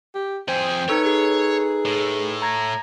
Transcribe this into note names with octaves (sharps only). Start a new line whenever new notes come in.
G4
F2 G#4 C5 G5
D#4 A4 B4 C#5
G#4
A2
A#5 G#6 A#6